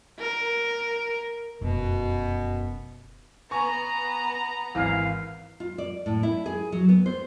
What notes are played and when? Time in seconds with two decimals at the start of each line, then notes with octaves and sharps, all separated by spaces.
0.19 A#4
1.61 F1 F#2 B2
3.51 B3 G#5 A#5 C#6
4.75 G#1 E3 F5
5.60 F4
5.78 D5
6.06 A2
6.23 E4
6.46 G#4
6.72 F#3
6.89 B3
7.06 C5